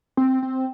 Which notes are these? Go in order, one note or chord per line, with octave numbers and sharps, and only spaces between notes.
C4
C4